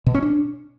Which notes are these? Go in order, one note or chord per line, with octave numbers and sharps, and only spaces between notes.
B2
C#4
D4